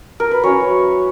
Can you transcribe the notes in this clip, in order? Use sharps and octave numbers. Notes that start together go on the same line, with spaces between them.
A#4
B4
F#3 C#4 E4 C#5